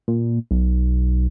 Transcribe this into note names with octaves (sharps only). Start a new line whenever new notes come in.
A#2
B1